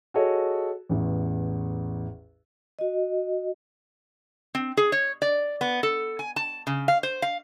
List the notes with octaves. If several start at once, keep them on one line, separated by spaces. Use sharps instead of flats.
F#4 G#4 A4 C#5 D#5
A1 E2
F#4 D#5
C4
G#4
C#5
D5
B3
A4
G#5
A5
C#3
F5
C5
F5